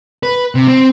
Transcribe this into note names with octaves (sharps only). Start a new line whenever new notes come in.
B4
C3
C4